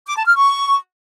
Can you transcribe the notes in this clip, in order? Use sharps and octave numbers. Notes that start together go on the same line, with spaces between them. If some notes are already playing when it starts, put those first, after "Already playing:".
D6
A5
F6
C#6